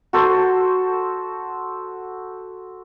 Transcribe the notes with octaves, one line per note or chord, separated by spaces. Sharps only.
F#4 A4 C5